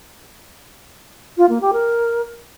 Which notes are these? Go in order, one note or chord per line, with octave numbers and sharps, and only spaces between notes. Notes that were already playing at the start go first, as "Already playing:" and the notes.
F4
A#3
G4
A#4